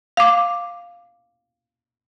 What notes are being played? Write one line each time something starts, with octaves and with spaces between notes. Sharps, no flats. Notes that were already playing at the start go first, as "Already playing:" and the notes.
F5 D6